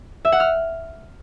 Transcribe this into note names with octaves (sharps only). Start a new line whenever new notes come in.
E5
F#5
F6